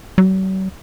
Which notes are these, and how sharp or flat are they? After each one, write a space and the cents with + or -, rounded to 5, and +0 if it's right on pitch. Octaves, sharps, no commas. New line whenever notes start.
F#3 +45